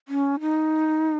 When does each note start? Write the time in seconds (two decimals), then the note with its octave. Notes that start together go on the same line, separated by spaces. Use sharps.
0.08 C#4
0.40 D#4